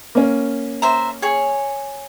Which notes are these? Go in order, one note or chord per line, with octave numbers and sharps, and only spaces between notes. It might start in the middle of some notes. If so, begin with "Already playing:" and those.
A#3 C#4
C5 E5 A#5
G#4 C#5